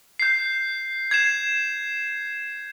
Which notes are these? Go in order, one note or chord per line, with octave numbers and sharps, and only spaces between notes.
G6 C7
G#6 C7 E7